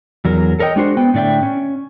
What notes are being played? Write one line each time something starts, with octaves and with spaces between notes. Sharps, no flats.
E2 F#3 A#4
A4 A#4 C#5 D#5 G5
G#3 D4 F#4 C5
B3 G5
A2 D3 D5 E5 G5
C#4